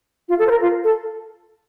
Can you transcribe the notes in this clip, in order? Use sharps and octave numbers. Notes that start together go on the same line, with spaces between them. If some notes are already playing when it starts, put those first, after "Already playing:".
F4
A4
C5
A#4
F4
A4